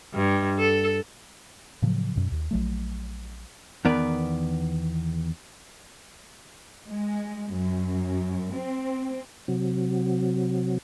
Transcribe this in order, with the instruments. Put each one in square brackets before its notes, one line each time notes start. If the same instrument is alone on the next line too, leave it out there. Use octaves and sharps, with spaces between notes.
[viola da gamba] G2
A4
[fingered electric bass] A2 C#3 F3 F#3
F#2 B2
D#2
A#1 F#3 A3
[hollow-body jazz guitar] E2 D#3 B3 A#4 B4 D5
[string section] G#3
F#2
C4
[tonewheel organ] C3 F#3